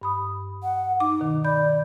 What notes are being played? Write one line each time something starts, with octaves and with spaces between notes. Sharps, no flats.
G2 B5 D#6
F#5
D#4 D6
B2 D#3
D5 B5 G6